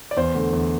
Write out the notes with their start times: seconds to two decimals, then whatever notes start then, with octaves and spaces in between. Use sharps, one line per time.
0.11 D5
0.17 E2 C5
0.35 D3 A3
0.53 E2